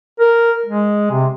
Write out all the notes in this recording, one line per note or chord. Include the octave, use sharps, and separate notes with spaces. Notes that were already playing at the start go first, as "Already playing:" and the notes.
A#4
G#3
C3